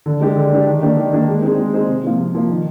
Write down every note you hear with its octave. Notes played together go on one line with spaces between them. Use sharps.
D3
G#3 D4 G4
D3
G#3 D4 G4
D#3
A#3 D4 G4
D#3
A#3 D4 G4
G#3
C4 D#4 G#4 C5
G#3
C4 D#4 G#4 C5
C3
F3 A#3 F4
C3
F3 A#3 F4
D#3